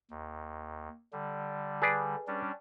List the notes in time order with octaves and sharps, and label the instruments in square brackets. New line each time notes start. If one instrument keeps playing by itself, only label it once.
[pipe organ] D#2
D3 G3
[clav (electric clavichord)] G#4 B4 D5
[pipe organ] G3 C#4 D4